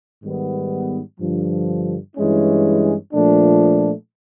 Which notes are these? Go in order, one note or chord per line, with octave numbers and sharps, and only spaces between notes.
G#2 D#3 G3 B3
G2 D3 F3
G2 E3 G#3 C#4 E4
A#2 F3 A3 D4